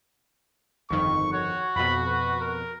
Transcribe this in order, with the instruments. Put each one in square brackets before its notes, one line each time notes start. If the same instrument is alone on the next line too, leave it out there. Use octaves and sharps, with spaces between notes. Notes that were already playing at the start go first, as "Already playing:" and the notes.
[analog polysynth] G1 F2 D#3 [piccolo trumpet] C#6
[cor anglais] F#4 [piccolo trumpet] C#5
[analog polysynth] F2 B2 [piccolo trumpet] B5
[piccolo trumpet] B4
A#4